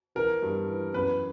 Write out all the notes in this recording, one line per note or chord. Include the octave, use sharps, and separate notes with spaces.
E3 A#4
G2
E3
F#2 B4